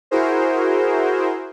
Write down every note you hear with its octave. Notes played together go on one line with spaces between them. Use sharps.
E4 F#4 G#4 A#4 C5